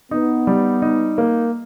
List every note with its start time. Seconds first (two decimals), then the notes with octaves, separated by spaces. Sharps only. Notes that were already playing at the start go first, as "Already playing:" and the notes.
0.11 B3 D#4
0.47 G3
0.82 D#4
1.18 A#3